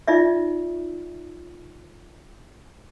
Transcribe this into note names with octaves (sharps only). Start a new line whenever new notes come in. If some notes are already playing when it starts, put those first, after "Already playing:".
D#4 F4 D5 E5